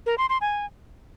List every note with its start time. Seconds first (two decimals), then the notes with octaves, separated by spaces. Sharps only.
0.06 A#4
0.18 C6
0.29 C6
0.41 G#5